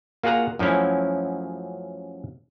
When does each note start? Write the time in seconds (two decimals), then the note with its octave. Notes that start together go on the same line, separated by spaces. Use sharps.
0.23 A#3 F4 F#4 G#4 F#5 A#5
0.59 F#2 F3 F#3 A3 C#4 E4